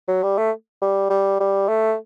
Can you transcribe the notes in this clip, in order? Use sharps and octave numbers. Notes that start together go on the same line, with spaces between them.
F#3
G3
A3
G3
G3
G3
A3